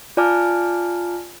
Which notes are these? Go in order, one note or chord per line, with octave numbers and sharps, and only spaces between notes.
F4 D5 G#5 A5 D6 F6